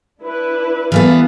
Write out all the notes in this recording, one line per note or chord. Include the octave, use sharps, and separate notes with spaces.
D4 E4 B4
E3 G3 B3 A4 F5